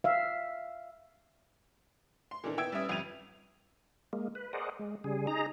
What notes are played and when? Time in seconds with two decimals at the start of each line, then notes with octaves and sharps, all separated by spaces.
0.04 E5 F5
2.31 C6
2.44 A#2 D#3 E3 D4 A4
2.57 B3 E4 G5 E6 G#6 D7
2.72 G3 C#4 B4 E5 D#6
2.89 G1 F2 G3 G#6 D#7 F7
4.13 G#3 A#3
4.35 B4
4.53 G#4 A#4 C5 D5 D#5 F#5
4.79 G#3
5.04 C#3 G3 G#4
5.27 D#4 G#4 A#5